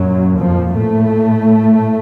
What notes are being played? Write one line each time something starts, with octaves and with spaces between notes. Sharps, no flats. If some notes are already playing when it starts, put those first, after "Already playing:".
Already playing: F#2 A#2 F#3
F2 F3
A2 A3